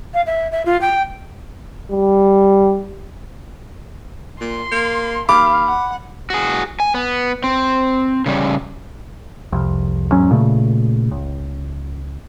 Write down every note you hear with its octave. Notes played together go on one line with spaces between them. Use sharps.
F5
E5
E5
F4
G5
G3
A#2 C6
A#3
D#2 F5 B5 D6
F#5
F#4 G#4
G#5
B3
C4
C#3 G3
C2 F2
E2 G#2 F#3 C#4
A#2 C#3 A3
C#2